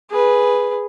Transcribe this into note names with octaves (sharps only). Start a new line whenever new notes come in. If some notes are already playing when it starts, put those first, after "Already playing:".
G#4 B4